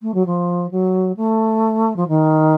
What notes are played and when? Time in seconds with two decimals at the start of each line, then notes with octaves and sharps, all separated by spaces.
0.02 A3
0.14 F#3
0.26 F3
0.71 F#3
1.16 A3
1.96 F3
2.08 D#3